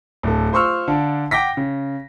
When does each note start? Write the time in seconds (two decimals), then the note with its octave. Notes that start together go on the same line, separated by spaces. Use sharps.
0.23 D1 A4
0.52 F4 C5 C6 C#6 E6 F6
0.88 D3 D4 F5
1.31 F#5 G5 D6 A#6 B6
1.57 C#3